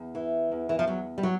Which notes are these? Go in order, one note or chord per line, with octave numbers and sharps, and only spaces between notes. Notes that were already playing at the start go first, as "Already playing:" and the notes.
Already playing: E2
E3
E2
E3
F3
E2 F#3
G3
F#3